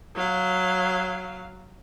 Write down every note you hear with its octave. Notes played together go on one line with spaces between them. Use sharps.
F#3 F5